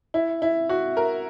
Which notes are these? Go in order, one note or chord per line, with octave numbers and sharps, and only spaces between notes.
E4
E4
F#4
A#4